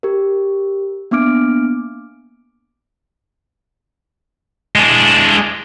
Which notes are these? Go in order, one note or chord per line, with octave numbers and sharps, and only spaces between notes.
G4 A#4
A#3 B3 D4 D6 F6 D7
G#3 D4